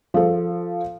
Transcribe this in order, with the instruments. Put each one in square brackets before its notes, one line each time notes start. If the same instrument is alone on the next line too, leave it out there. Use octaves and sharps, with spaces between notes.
[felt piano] F3 A4